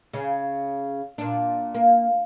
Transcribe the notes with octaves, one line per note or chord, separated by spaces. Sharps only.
C#3
A#2 D4
A#3